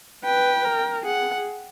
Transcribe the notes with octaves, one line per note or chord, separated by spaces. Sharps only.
B4 G5
A#4
G#4 F#5